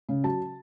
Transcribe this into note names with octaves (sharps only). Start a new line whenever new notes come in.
C#3
F#3 A5